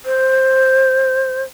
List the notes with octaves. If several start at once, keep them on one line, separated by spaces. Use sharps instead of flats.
C5